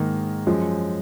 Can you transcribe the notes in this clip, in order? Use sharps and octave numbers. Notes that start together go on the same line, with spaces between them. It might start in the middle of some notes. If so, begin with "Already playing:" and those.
Already playing: G#2 D#3 A#3
F#2 F3 G#3